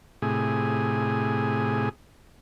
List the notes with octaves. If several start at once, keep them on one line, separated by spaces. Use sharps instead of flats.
A2 C3 G#4